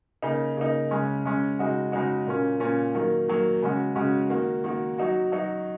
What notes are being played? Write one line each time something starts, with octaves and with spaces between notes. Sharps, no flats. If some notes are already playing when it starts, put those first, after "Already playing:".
C#3 A#3 D#4
C#3 A#3 D#4
C#3 G#3 C#4
C#3 G#3 C#4
C#3 G#3 D#4 F#4
C#3 G#3 D#4 F#4
A#2 A#3 C#4
A#2 A#3 C#4
D#3 F#3 A#3
D#3 F#3 A#3
C#3 G#3 C#4 F#4
C#3 G#3 C#4 F#4
D#3 A#3 F#4
D#3 A#3 F#4
F#3 D#4 F#4
F#3 D#4 F#4